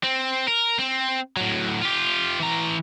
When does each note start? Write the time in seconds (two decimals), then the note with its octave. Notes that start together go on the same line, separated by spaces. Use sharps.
0.04 C4
0.48 A#4
0.79 C4
1.37 A2 F#3
1.82 F4 G4
2.40 E3 A#5